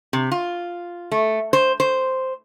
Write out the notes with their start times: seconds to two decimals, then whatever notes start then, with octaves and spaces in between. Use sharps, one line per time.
0.13 C3
0.31 F4
1.12 A3
1.53 C5
1.80 C5